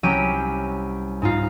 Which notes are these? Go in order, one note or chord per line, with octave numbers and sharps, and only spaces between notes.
C2 F#3 C#4 G4 G5 D#7
G#2 D#4 F4